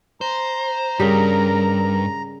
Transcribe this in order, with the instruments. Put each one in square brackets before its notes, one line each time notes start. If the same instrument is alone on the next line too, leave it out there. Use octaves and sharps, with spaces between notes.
[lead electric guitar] C5 [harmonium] A#5
[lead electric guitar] G2 [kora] C#3 G3 [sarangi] A#4